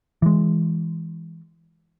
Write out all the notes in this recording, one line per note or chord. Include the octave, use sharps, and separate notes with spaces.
E3 G#3